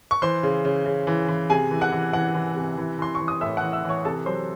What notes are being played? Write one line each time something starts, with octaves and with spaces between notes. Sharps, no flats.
C#6
E3 C5 C6
C#3
C#3
C#3
E3
E3
C3 G#4 G#5
E3
F#5 F#6
E3
E3 F#5 F#6
E3
C3
E3
E3 C6
C#6
E3
D#6
A2 E5 E6
F#5 F#6
E3
E5 E6
E3
C#5 C#6
C3 A4 A5
F#3 C5 C6